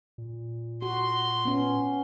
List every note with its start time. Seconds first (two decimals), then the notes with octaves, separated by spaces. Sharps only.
0.18 A#2
0.82 F#4 C6
1.45 B3 C#4